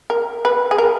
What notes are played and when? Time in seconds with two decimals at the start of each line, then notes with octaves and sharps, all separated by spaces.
0.10 A#4
0.45 B4
0.71 G#4
0.78 A#4